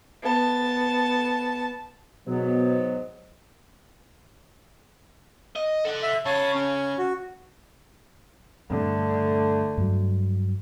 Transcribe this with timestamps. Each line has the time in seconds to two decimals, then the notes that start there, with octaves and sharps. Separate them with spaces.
0.23 B3 A5
2.27 G#2 B2 F#3 B3
5.56 D#5
5.85 A4 F#5
6.03 E5
6.26 C#3 C#5 A5
6.55 C#4
6.98 F#4
8.70 G2 D3 A3
9.77 G2 F#3